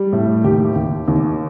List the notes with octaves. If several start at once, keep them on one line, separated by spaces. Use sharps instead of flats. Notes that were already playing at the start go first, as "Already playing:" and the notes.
Already playing: G3
A2
D#2 G4
D#2
D#2